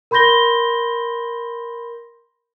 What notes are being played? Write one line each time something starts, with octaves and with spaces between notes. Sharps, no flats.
A#4 B5 C6 G6 A#6 G7